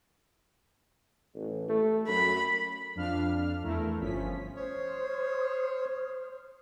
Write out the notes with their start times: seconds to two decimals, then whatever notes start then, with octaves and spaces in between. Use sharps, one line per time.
1.35 A1
1.69 A3
2.08 F#2 B5
2.95 F2 D4 F5 F6
3.63 E2 A3 E4 A#4
4.00 G1 F3 C#4 B6
4.56 C5 C#5 D#6 F6